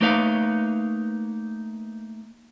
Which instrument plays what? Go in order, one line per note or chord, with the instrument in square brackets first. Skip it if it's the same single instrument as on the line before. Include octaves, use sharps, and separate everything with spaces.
[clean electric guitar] A3 A#3 D#4 B4 C#5 F5